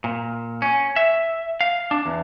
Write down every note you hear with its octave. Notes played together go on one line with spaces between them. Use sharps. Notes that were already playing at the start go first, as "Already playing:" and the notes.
A#2
C#4
E5
F5
D4
E2